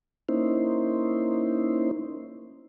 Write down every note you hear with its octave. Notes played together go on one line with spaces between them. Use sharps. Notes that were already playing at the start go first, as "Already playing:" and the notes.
A#3 C#4 D#4 E4 C5